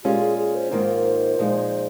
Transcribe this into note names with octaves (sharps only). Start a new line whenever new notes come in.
A#2 G#3 C#4 F4 G4
G#4
G#4
C5
G#2 D#3 A#3 F4 A#4
A#2 F3 G#3 D#4